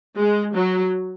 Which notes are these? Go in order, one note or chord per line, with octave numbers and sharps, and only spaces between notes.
G#3
F#3